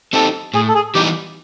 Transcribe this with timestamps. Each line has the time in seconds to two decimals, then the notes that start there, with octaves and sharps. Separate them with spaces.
0.13 C4 D#4 G4 A4
0.54 A2 G#4
0.68 A4
0.74 G#4
0.94 E3 G3 B3 D#4 G4